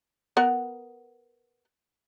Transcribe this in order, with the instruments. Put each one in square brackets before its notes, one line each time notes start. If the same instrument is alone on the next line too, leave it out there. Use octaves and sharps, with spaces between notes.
[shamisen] B3 A#4 F#5